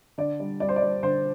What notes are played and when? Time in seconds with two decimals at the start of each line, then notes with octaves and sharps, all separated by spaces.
0.18 D3 D5
0.40 G3
0.60 G3 D5
0.69 C5
0.76 D5
0.82 G3
1.03 D3 C5